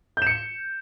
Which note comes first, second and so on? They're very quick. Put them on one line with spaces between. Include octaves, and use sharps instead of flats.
G6 E7 C#7